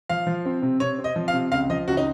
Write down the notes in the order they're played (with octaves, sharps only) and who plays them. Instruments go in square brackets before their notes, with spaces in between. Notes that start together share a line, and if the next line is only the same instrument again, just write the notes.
[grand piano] F3 [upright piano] F5
[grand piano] F3
C4
C3
[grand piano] C3 [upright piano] C#5
[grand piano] C4
[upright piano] D#5
[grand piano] F3
[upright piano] F5
[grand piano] C3
[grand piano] C#2 [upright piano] F5
[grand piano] F3 [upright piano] D#5
[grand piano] C#2 [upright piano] F#4
[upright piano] D#4